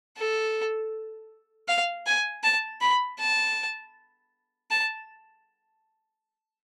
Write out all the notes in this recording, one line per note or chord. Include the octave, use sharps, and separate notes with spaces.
A4
F5
G#5
A5
B5
A5
A5